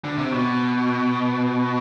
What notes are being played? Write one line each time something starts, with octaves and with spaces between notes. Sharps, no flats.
D3
C3
B2